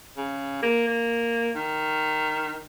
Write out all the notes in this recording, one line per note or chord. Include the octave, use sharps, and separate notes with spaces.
C#3
A#3
A#3
D#3